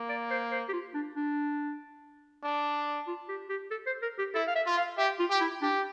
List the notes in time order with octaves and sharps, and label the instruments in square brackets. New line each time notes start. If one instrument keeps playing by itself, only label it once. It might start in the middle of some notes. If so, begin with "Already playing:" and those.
Already playing: [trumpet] A#3
[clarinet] D5
C5
C5
G4
F4
D4
D4
[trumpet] D4
[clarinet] F4
G4
G4
A4
C5
A#4
G4
[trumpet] E4 [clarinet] A4
[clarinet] F5
E5
[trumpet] F4
[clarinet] F5
[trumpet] G4 [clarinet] E5
[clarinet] F4
[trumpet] G4
[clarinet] E4
[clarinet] D4 [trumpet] G4